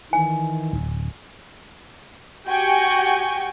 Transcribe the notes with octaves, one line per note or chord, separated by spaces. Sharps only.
D#3 E3 G#5
D1
F#4 G4 G5 G#5 C#6